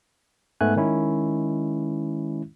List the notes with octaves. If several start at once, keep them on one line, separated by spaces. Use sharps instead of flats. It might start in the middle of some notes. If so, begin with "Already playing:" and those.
G#2 A3 B3 G#5 F#6
D#3 G#3 C#4 E4